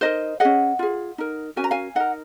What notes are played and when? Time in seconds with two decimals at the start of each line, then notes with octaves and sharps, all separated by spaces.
0.01 D#4 F#4 A#4 C5 D#5
0.40 C#4 G#4 D#5 F#5
0.79 F4 G#4
1.18 D#4 A#4
1.56 C#4 F#4 A#4 G#5
1.64 A#5
1.71 F5 G#5
1.95 D#4 A#4 D#5 F#5